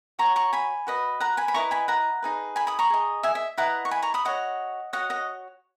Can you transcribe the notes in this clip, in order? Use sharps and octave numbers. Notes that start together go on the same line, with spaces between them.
F#4 C#5 A#5 C#6
A#5 C#6
G#5 B5
F#4 B4 D#5
F#5 A#5
G#5 B5
B5
E4 B4 D#5 A#5 C#6
G#5 B5
F#5 A#5
D#4 G#4 B4
G#5 B5
B5 D#6
A#5 C#6
G#4 D#5
E5 G#5
E5
E4 B4 D#5 F#5 A#5
C#6
G#5 B5
A#5 C#6
B5 D#6
F#4 C#5 D#5 F#5
F#4 C#5 D#5 F#5
D#5 F#5